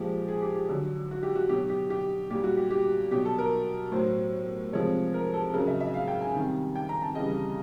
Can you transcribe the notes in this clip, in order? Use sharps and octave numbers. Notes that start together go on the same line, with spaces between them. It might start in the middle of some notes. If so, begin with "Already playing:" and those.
Already playing: A#2 F3 G#3 G4
G#4
G4
G4
D3 F#3
F#4
G4
F#4
B2 F#3 G4
G4
G4
A#2 G3 G4
F#4
G4
G4
B2 F#3 G4
A4
A#4
A2 F#3 C5
C3 F3 G#3 C#5
A#4
A4
C#3 F#3 A#4
E5
E5
F5
G5
G#5
C3 D#3 G3
G5
A#5
A5
C#3 E3 G3 D#5